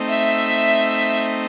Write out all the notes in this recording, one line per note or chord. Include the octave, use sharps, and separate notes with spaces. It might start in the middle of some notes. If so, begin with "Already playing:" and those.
Already playing: A3 C4 D#4
E5